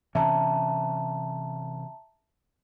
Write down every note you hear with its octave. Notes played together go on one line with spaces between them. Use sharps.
C3 E3 C#4 E5 A5 A#5